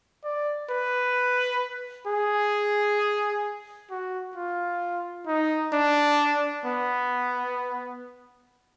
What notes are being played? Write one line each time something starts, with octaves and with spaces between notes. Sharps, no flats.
D5
B4
G#4
F#4
F4
D#4
D4
B3